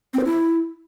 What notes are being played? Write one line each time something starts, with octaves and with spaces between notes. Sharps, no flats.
C4
C5
E4